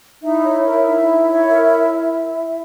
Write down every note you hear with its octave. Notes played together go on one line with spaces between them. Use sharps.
D#4 E4 E5
C#5
A#4
D#4
D#4
C#5
A#4